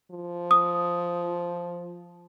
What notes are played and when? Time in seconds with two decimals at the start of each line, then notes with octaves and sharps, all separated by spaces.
0.12 F3
0.51 D#6